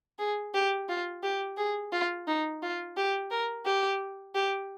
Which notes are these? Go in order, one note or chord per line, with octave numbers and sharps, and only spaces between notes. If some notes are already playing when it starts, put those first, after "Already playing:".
G#4
G4
F4
G4
G#4
F4
D#4
F4
G4
A#4
G4
G4